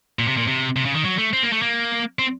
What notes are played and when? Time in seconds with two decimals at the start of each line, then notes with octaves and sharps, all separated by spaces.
0.19 A#2
0.28 C3
0.37 A#2
0.47 C3
0.76 C3
0.85 C#3
0.95 D#3
1.05 F#3
1.18 A3
1.33 C4
1.43 A#3
1.52 A3
1.62 A#3
2.19 C4